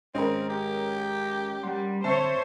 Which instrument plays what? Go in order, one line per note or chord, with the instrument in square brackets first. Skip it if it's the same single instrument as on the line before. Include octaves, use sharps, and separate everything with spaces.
[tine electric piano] G#1 G#3 D#5 [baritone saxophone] C4 [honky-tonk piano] C#4 A#4
[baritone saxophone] G4
[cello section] G3 [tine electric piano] F#5 C6
[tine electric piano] D3 C4 [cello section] C5 C#5 [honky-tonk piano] E5 A5